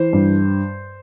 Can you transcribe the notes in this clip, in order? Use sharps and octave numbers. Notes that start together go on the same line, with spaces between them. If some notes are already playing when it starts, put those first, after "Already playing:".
Already playing: E3 C5
G2